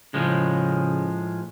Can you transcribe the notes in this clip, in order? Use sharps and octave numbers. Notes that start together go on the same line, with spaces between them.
A2 C#3 F3 G#3